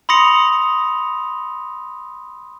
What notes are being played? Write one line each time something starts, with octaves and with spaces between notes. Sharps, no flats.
B5 C6 D#6 A#6 C#7 F7